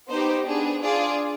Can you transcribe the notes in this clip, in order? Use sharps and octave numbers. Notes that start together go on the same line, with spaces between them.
B3 D#4 G4 C5
B3 D4 G#4
D4 F4 G#4 D5